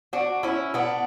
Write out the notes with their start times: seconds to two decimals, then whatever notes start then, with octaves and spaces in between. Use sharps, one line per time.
0.13 D4 F#4
0.43 C#4 E4
0.74 B3 D4